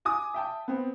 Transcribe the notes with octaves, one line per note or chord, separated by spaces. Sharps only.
G#5 D6 D#6
E5 G5 A5
B3 C4